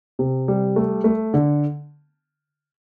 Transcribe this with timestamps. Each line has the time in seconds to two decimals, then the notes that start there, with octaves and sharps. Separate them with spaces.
0.19 C3
0.48 G3
0.76 A3
1.04 A3
1.34 D3